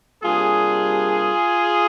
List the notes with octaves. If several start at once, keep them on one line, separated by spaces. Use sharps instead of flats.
C3 G3 A#3 D4 F4 G#4